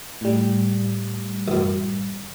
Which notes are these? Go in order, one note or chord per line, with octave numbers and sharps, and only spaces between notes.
A2 G3
A1 F#2